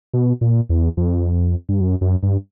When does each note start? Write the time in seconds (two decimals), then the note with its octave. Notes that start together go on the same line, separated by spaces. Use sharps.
0.14 B2
0.41 A#2
0.69 E2
0.97 F2
1.69 G2
1.81 F#2
2.01 F#2
2.23 G2